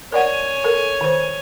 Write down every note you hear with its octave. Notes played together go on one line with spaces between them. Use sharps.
A#4 C#5 D5 F#5 G#5
A4 A#4
D#3 C5